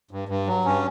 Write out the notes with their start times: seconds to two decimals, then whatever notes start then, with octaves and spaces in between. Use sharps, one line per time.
0.11 G2
0.29 G2
0.47 F#3
0.65 G2 C#4